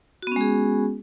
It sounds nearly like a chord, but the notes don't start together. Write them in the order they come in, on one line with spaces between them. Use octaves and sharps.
F#4 B3 C#4 G#3 G#4